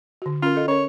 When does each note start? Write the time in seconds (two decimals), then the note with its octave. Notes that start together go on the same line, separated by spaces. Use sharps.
0.22 D3 F#4
0.42 C#4 F4 A#4
0.56 A4 D#5
0.68 C#4 A#4 C#5